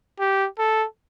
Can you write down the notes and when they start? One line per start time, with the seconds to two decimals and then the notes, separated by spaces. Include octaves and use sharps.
0.20 G4
0.58 A4